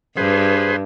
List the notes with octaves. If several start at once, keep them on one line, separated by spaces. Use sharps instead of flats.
G2 G#4 B4 C5